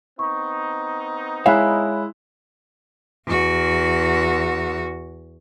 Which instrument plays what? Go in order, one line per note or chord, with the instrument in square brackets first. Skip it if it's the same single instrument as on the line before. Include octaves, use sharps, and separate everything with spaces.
[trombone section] B3 C4 D#4 [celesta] C#6
[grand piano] G#3 E4 [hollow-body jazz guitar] C#5 E5 F5 [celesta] G#5 B5 F#6
[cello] E2 F#4